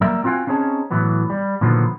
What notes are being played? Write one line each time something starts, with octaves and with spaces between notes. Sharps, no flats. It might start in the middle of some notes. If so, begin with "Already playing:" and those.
F#3 G3 A#3 A#4 E5
C4 F4 F#4 F5 G5 G#5
C4 C#4 D#4 G#4 C#5 A5
A2 E3 F#3 B3
G3
A#2 D3 D#3 F3 F#3 B3